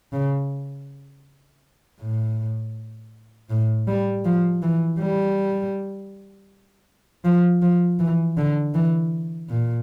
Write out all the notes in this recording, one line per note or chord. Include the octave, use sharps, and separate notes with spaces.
C#3
A2
A2
G3
F3
E3
G3
F3
F3
E3
D3
E3
A#2